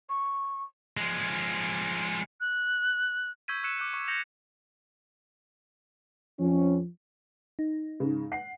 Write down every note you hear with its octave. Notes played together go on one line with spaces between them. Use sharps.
C#6
F3 G#3
F#6
C#6 E6 G6 G#6 B6 D#7
C#6 E6 F#6 C#7 D#7 E7
D6 F#6 G6
C#6
E6 G6 A#6 C#7 E7 F7
F2 F3 C#4
D#4
G#2 C#3
F#5 C7